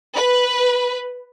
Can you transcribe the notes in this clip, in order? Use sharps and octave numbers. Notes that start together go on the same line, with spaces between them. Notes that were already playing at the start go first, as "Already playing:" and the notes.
B4